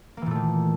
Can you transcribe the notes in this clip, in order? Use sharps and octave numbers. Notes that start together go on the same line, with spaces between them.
A#2 D#3 E3 A3 A#3